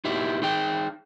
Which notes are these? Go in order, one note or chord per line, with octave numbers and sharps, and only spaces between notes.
D#4 E4 G4
D#4 G#4 G5